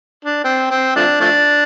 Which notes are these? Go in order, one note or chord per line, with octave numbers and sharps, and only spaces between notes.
D4
C4
C4
F3 A3 D4
F3 A3 D4